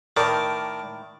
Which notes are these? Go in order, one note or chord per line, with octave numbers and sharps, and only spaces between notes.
A2 D#3 A#4 D5 A5